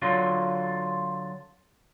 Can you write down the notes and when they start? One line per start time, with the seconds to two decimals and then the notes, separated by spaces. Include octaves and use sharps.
0.02 D3 F#3 F4